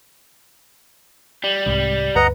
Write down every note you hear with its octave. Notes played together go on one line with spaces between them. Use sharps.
G3
C2 G#2 C3
D2 G2 B4 D#5 F#5 A#5